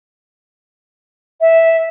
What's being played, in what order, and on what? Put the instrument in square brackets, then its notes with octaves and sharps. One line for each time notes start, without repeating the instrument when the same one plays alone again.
[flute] E5